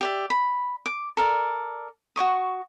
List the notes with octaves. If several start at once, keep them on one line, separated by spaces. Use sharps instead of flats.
G4 D5 E5
B5
D6
A4 A#4 D5
F#4 D5 C#6 D#6